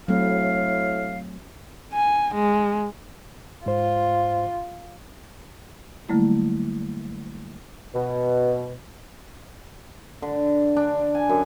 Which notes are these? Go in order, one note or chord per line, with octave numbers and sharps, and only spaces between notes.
A2 F#3 A3 C4 F5
G#5
G#3
G#2 F4 C5
D3 F#3 G3 A3 A#3 E4
B2
D3
D4
G#5
F#2